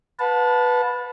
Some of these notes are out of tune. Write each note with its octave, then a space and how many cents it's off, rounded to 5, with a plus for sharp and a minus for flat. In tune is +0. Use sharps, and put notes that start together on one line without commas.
B4 +0 F#5 -45 A5 -5